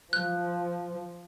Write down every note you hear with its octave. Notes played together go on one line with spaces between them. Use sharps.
F3 F#6